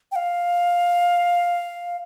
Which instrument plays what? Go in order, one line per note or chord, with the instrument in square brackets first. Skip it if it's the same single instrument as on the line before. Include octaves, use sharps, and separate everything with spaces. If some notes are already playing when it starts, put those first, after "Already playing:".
[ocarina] G5
F5